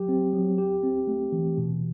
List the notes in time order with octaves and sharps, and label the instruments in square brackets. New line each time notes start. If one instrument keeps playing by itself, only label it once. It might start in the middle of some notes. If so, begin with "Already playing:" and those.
Already playing: [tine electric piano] F#3 G4
C4
F#3
G4
C4
A3
E3
B2